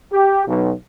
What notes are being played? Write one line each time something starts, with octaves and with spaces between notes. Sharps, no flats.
G4
B1